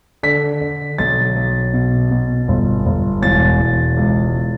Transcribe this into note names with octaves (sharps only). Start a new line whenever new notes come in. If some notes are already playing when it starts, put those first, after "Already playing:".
D3 B6
D3
B1 A6
B1
B2
B2
G1
G1
E1 A6
E1
C#2